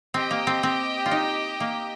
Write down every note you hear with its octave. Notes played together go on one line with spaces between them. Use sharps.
C4 G4 D#5 G5
A#3
C4
C4
F4
D#4
A#3